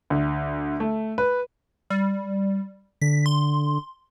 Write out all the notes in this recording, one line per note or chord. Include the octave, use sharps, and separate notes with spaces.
D2
A3
B4
G3
D3 B6
C6